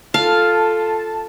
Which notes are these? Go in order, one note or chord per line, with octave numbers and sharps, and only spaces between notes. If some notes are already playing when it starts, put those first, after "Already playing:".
F4 A4 F5 A5